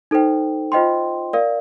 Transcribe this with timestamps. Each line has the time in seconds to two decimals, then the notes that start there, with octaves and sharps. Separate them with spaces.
0.11 D#4 A4 C5 G5
0.72 F4 C5 D#5 G5 C6
1.33 A#4 D5 F5